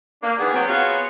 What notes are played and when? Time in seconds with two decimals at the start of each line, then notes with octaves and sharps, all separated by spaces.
0.22 A#3 D4
0.38 D#3 E3 B3 G#4
0.53 F#3 B3 C4
0.68 B3 F4 F#4 G#4 C#5 F5